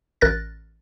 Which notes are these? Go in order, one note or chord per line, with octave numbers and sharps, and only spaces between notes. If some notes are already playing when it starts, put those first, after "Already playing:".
A1 A#4 F#6 A6 A#6